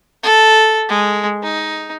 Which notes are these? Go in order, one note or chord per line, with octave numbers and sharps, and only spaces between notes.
A4
G#3
D#4